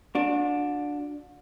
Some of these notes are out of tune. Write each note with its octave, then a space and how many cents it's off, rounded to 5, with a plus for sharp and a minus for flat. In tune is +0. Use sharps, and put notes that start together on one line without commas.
D4 +0 F#4 -40